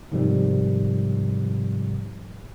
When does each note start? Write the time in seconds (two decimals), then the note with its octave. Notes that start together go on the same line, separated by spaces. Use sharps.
0.12 G#2 C3 D#3 F3 G3